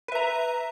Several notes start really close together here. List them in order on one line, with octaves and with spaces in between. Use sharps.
B4 E5 A#5